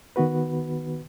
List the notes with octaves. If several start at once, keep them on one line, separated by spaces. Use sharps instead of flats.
D#3 B3 F#4 B4